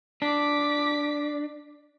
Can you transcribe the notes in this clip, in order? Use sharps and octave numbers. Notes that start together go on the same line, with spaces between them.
D4 D6 B6